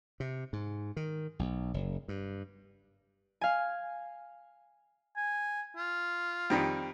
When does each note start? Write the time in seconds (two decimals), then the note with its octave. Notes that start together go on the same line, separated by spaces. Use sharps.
0.20 C3
0.53 G#2
0.97 D#3
1.39 B1
1.74 F#1
2.08 G2
3.41 F5 G#5
5.16 G#5
5.77 F4
6.50 F2 D#3 G3